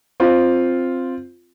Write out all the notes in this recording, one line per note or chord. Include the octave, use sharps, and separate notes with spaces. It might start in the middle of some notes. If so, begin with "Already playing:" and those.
C4 F4